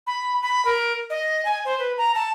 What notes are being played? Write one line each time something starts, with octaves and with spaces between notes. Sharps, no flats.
B5
B5
A#4
D#5
G#5
C5
B4
A#5
A5